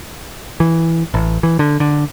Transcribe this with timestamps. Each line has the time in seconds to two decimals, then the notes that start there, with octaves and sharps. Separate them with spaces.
0.60 E3
1.14 A1
1.43 E3
1.59 D3
1.80 D3